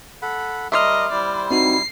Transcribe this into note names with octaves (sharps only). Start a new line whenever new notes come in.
A4 F#5 B5
G3 A#4 D#5 E5 C6 D6 F6
G3 E4 C5 D5
C4 D#4 F#4 C7